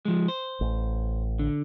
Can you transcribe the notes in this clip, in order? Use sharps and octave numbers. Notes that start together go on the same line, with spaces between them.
F3 G#3
C5
A1
D3